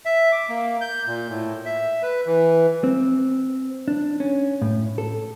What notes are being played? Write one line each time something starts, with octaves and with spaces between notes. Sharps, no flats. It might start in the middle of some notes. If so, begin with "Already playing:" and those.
E5
D6
A#3
G6
A#2
A2
E5
B4
E3
C4
D4
C#4
A2
A4